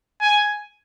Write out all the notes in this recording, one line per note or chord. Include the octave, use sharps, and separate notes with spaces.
G#5